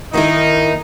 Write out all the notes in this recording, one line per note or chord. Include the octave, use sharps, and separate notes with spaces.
D#3 A#3 D#4 E4 A#4